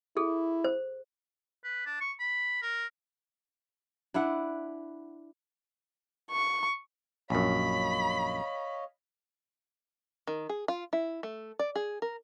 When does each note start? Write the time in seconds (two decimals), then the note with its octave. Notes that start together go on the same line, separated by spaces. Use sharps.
0.17 E4 G#4 A4
0.64 C5
1.64 B4
1.86 D4
2.01 C#6
2.20 B5
2.62 A#4
4.14 D4 E4 B4 F#5
6.31 C#6
7.30 A#1 F#2 C#5 D#5 F5 B5
10.27 D#3
10.49 G#4
10.68 F4
10.93 E4
11.23 A3
11.59 D5
11.75 G#4
12.02 A#4